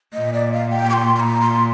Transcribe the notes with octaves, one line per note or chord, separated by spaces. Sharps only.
A#2 D#5
D5
F5
G5
D6
C6
C6
A#5
C6